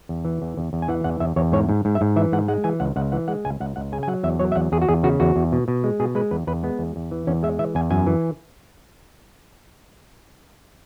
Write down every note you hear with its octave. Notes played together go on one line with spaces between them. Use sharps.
E2
E3
E2
E2
E2
G#5
E3 F#5
E2 F#5
E2 E5
E2 C#5
G#2 C#5
G#2
G#2
E5
G#2
E3 E5
G#2 F#5
G#3 F#5
E3 G#5
C#2 F#5
C#2 F#5
E3 F#5
G#3 F#5
C#2 G#5
C#2 F#5
C#2 F#5
C#3 G#5
G#5
F#3 F#5
E2 E5
F#3 C#5
E5
E2 F#5
E2 G#4
F#4
E2 G#4
C#3 F#4
E2 F#4
E2
B2
B2
G#3
B2 G#4
G#3 B4
E2 B4
E2 B4
G#3 B3
E2
E2
E3
E2 C#4
G#3 E5
E3 E5
E2 G#5
F#2 G#5
E3